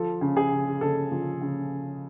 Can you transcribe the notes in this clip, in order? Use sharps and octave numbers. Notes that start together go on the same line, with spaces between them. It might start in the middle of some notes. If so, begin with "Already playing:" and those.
Already playing: F3 A4
C#3
G#4
C#3
C#3 A4
F3
C#3